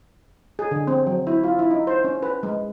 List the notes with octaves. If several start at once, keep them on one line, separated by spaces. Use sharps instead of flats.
G#4
D3
C4
F#3
E4
F4
E4
D#4
C5
C#4
B4
G#3